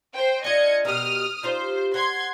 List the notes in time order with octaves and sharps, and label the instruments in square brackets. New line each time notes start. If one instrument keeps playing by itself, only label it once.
[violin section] C5 G5
[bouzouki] D4 F4 [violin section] D#5 G#6 C#7
[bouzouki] B2 G4 A#4 [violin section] D#6 F6
[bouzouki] D#4 F4 G4 [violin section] C5
[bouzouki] F#5 [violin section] C6 G#6